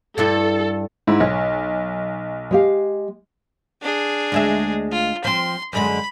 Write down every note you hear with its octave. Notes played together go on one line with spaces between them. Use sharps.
G2 D4 E4 A4
G#2 E4
B1 C#5
G#3 G4 F5
D4 G#4
D2 G#3 E5
F4
F3 C4 C6
F#2 D3 G#3 B5